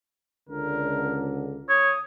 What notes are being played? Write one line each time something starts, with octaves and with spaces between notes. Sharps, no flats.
C#2 D3 A#4
C#5 D#6